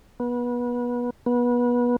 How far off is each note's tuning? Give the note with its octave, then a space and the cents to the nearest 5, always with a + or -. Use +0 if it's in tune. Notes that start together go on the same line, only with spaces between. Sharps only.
B3 -25
B3 -25